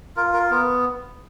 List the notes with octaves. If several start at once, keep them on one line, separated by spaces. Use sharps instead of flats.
F4 A#4
A#4
B3 A#4